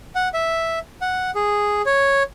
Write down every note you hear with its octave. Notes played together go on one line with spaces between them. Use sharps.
F#5
E5
F#5
G#4
C#5